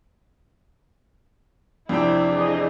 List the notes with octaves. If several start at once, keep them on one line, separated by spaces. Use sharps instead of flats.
F2 C3 D4 E4 G5
E3 G#4 D#5